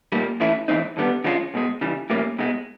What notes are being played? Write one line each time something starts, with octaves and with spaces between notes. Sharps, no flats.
C2 A#2 G3 A#3
G#2 E3 A3 C#4 E4
G#2 E3 G#3 C4 D#4
D#2 D3 G3 B3
D3 F3 G#3 C#4 F4
B1 B2 G#3
C#2 C#3 E3 G3
A2 E3 G3 A#3 C#4
C2 B2 G#3